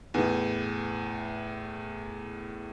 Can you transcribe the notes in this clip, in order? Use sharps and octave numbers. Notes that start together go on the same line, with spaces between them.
E2 A2